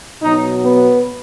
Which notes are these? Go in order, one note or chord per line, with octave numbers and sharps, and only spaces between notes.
B2 F#3 D#4
B3